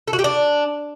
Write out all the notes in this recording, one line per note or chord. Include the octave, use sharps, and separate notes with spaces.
A4
F#4
G4
D4